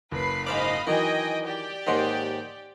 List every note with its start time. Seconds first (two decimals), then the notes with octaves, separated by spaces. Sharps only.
0.11 F#1 B4 B5 C7
0.47 G#2 C5 D5 D#5 F5 B5
0.87 D#3 E3 F#3 D#5 G5 G#5
1.46 G4 D5 G5
1.87 D#2 G#2 D#3 D#5 F#5 C6